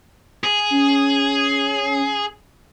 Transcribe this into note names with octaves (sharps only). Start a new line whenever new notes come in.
G#4
C#4